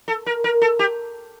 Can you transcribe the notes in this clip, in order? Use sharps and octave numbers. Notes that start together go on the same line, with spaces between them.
A4
A#4
A#4
A4
G4